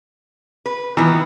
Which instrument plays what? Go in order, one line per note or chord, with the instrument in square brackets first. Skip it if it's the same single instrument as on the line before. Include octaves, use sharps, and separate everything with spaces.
[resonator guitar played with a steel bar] B4
[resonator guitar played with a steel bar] D#3 B3 [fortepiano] E3